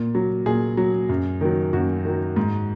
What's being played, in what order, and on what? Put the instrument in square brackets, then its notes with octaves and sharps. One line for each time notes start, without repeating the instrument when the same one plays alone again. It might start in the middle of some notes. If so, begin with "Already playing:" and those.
Already playing: [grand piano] A#2
F#3
A#2 G#4
F#3
F#2
D#3 F#3
F#2 F#4
D#3 F#3
G#2